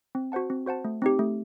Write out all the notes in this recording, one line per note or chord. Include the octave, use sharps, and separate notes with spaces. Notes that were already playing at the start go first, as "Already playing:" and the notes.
C4
F#4 C5 F#5 A5
C4
F#4 C5 F#5 A5
A3
C4 D#4 G4
A3